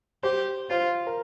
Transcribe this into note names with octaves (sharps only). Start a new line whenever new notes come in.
G4 C5
F4 C5
A#4